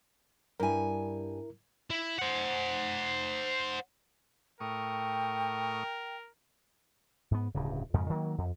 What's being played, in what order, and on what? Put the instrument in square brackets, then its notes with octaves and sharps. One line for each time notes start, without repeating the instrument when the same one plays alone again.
[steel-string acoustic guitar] G2 G#5 [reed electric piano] E4 A#4
[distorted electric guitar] E4
C5 F#5
[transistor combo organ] A2 C#6 D#6 [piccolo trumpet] A#4 [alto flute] G5
[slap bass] G#2 B3
D1 G2 C#3
F2 G#2 C#3
D#3 F#3 A#3
F2